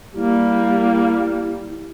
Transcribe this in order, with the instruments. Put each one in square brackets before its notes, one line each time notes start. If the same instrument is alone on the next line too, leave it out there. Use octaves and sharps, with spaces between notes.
[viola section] G3 [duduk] A#3 [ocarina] E4